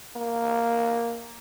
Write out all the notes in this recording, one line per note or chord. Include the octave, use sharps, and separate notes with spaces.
A#3